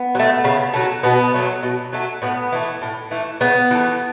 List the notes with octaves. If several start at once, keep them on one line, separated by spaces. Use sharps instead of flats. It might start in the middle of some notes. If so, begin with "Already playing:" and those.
Already playing: B3
F#3
A3
C#3
F#3 A3
B2 B3
F#3 A3
B2
F#3 A3
A2 B3
E3 A3
A2
E3 A3
C#3 B3
E3 A3